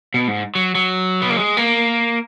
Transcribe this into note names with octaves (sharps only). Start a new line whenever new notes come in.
B2
G#2
F#3
F#3
B3
A#3
G#3
A#3